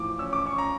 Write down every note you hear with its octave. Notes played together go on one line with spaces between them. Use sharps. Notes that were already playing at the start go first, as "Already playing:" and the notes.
Already playing: A2 E3 F3 D6
C#4 E6
D6
C#4 C#6
A#5